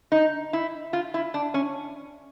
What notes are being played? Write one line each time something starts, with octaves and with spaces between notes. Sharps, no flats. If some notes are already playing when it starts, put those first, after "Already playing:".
D#4
E4
F4
E4
D4
C#4